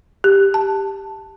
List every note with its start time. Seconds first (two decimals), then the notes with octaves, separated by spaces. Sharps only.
0.24 G4
0.54 A5